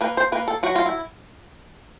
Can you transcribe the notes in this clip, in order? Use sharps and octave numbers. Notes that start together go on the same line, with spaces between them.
A#3 B4
C5
A#3 B4
A4
F#3 F#4
F4
E4